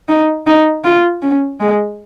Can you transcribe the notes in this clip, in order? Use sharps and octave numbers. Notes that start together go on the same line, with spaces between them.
D#4
D#4
F4
C#4
G#3